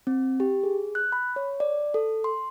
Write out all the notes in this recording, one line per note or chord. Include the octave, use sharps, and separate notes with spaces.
C4
G4
G#4
F#6
B5
C#5
D5
A4
C6